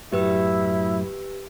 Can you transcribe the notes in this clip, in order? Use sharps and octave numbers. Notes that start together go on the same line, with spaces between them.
F#2 A2 F#3 E4 G4 B4 E6